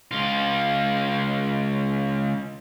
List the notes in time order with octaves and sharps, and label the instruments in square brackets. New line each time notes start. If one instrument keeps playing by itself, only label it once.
[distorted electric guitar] C#2 F4